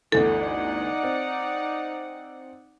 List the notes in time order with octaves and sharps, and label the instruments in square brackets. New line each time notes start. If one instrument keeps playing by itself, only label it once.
[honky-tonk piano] G1 D2 E3 [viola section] D#4 D5 F#5 [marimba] A4
[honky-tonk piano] C4